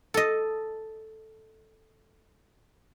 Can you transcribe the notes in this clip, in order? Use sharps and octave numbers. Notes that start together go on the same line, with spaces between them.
A4 D#5